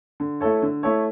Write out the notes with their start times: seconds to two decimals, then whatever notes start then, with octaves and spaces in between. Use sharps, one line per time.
0.20 D3
0.41 A3 E4 A4 C#5
0.62 D3
0.83 A3 E4 A4 C#5